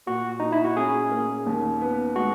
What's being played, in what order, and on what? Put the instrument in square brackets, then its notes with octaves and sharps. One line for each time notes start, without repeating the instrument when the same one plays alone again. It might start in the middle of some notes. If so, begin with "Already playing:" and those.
[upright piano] A#2 [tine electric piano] F#4
[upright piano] A#2 [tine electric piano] D#4
[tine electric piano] E4
F#4
[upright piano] C#4 [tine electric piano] G#4
[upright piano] A#3
D#2
B3
[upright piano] G#3 [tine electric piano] F#4